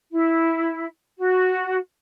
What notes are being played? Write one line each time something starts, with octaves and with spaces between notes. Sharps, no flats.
E4
F#4